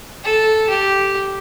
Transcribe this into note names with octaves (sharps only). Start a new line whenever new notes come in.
A4
G4